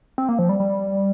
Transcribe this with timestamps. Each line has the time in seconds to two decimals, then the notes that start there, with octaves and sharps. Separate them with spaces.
0.18 C4
0.29 A#3
0.39 F3
0.49 G3
0.60 G3